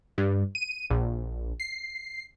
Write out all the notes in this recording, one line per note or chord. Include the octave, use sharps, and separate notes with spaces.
G2
D#7
A#1
C7